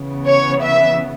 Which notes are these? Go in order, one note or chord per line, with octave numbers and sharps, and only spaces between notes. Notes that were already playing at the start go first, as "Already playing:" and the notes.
Already playing: C#3 E3 B3
C#5
E5